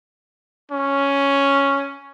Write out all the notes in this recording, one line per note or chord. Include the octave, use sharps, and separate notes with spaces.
C#4